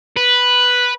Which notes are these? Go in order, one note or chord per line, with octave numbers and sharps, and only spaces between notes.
B4